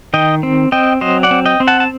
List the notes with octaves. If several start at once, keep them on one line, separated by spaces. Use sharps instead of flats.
D#3 D#5 G5
C4
C4 D#5 G5
F#3 C5 D#5
D5 F#5
C4
D#5 G5
C4
F#5 A5
A5